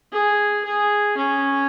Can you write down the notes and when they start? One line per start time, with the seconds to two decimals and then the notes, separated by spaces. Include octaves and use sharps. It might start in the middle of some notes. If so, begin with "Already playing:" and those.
0.12 G#4
0.65 G#4
1.17 C#4